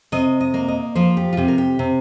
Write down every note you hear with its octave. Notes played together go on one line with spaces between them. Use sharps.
C3 D#5
D#5
A#3
D#5
F3 C5
G4
F4
C3 G4
A#4
G4
C3